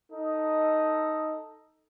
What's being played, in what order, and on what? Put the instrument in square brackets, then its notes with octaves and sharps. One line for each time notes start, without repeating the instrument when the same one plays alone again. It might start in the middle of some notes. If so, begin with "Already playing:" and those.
[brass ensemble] D#4 A4 D#5